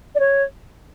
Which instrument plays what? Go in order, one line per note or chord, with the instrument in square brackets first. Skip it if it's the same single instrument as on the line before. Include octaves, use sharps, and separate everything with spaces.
[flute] D5
C#5